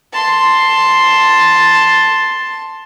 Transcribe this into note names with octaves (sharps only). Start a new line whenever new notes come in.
A5 C6